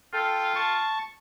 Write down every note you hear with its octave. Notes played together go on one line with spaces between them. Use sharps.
F4 A4 G5
A5 C#6